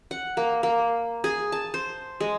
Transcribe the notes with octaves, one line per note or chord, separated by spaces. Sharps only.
F#5
A#3
A#3
G#4
A5
C5
G#3